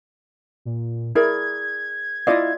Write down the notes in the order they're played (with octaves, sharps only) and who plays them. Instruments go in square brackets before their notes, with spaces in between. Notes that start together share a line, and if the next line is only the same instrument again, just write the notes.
[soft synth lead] A#2
[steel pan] E4 [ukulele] G#4 A#4 D5 [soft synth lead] G#6
[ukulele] E4 F5 [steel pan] F4 D5 D#5